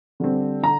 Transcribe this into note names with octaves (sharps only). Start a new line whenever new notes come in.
D3 G3 C4
D3 A#5